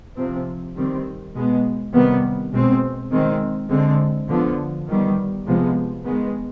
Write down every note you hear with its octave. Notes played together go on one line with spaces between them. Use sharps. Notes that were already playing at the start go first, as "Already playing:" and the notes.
C3 F3 C4
D#3 G3 C4
B2 G#3 B3
C3 D#3 G3 B3
B2 G#3 C4
D#3 G#3 C4
D3 G#3 C4
D3 F3 B3
D#3 G3 B3
C3 F3 G#3 B3
D#3 G#3 B3